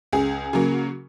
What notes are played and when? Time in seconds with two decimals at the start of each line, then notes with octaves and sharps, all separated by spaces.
0.13 C#2 G#4
0.53 C#3 F#3 A#3